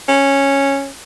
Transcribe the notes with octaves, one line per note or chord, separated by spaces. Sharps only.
C#4